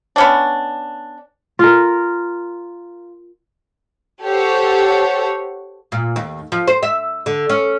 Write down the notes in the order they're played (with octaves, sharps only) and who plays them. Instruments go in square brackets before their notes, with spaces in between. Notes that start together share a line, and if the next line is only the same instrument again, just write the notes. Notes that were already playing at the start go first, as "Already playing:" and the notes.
[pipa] B3 C#4 D4
[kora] F4 A#4
[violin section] G4 A4 C5 C#5 F#5
[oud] A#2
D#2
F3
C5
E5
D3
C#4